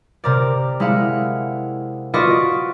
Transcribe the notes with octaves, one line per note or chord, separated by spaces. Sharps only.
C3 A#4 D5
G#3 E4 F5 F#5
F4 F#4 B4 D5 D#5 C#6